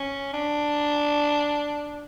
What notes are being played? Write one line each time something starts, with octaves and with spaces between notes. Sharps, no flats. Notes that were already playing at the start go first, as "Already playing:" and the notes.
Already playing: C#4
D4